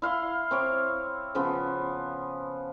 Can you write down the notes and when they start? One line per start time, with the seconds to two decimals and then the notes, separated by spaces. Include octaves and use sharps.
0.02 E4 F5 C6
0.51 C4 C#5 D6
1.35 C#3 F3 B3